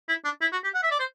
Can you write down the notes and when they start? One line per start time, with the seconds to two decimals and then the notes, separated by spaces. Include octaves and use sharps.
0.09 E4
0.25 D4
0.41 E4
0.52 F#4
0.63 G4
0.74 F#5
0.83 E5
0.91 D5
0.99 C5